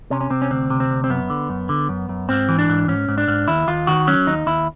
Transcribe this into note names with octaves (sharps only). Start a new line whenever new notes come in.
C3 C#4
C#4
C3 C4
C#4
D2 C4
C3
C4
D2
C4
F#2 B3
D3
F#2
D3
F#2
F#2
G#2 C4
E3
D4
G#2
G#2 C#4
G#2
D4
G#2
D#2 E4
D#2 F4
D#3 F#4
F#3 C#4
D#2 D#4
D#2 E4